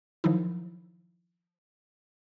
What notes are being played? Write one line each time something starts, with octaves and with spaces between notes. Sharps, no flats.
D#3 F3 F#3 D#4 E4